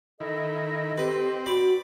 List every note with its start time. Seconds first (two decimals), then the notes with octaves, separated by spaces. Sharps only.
0.20 D#3 E4 A4 D#5
0.98 C4 G4 B4
1.46 F#4 D5 B5